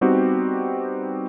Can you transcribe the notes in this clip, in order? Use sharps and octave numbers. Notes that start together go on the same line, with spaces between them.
G3 B3 C4 D#4 F#4 G4